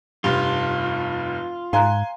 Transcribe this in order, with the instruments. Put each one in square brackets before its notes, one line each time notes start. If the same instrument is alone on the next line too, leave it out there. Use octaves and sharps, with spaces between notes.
[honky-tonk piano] F1 G2 [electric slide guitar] F4
[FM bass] G#2 [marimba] F5 A#5 F#6 [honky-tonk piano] G#5 C6